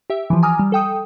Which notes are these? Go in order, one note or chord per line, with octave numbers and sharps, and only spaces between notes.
G4 E5
E3 F3
G#5 A#5 D6 D#6 F6
G3
A4 G5 D#6